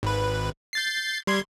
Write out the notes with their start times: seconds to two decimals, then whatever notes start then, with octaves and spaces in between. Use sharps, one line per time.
0.03 G#1 B4
0.73 G6 A6 C7
1.27 G3 C6 G#6